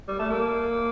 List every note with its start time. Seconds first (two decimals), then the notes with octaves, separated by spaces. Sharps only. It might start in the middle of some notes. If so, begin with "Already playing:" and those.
0.08 G3
0.19 A3
0.30 A#3